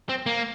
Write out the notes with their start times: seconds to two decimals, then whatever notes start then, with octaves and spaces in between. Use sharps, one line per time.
0.09 C4
0.26 A#3